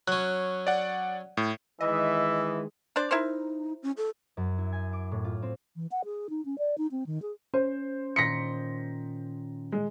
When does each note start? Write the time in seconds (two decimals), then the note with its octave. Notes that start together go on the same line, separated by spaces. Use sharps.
0.08 F#3 C#4 F#6
0.67 D5 F#5
1.37 A2
1.81 D#3 E3 G#3 D#5 E5
2.96 D4 C5 D5
3.11 D#4 E4 A#4 C5
3.83 C#4
3.97 A4
4.37 F#2
4.58 E4
4.72 G#5
4.93 D6
5.12 A2
5.24 F4
5.42 C4
5.76 E3
5.91 F#5
6.05 G#4
6.30 D#4
6.45 C#4
6.58 D5
6.78 D#4
6.91 C4
7.07 D#3
7.22 G#4
7.54 C#4 C5
8.16 A#2 D#3 C6 A#6 B6 C#7
9.72 G#3